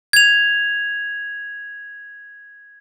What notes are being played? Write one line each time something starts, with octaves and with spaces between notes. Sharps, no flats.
G#6 F7